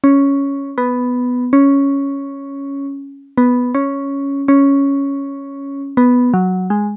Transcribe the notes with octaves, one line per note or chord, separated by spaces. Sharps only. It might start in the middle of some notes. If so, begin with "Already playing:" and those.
C#4
B3
C#4
B3
C#4
C#4
B3
F#3
G#3